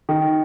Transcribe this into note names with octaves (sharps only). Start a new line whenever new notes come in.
D#3